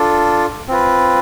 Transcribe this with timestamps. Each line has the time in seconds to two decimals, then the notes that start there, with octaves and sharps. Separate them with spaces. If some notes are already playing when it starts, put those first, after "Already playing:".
Already playing: D4 F4 A4
0.68 C4 F4 B4